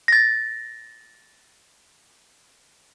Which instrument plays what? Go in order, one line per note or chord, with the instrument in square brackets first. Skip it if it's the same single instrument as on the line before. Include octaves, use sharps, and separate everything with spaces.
[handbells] A6 A#6